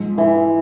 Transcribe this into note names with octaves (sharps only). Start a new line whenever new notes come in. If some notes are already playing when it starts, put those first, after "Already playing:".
Already playing: G#2 F3 G#3
E3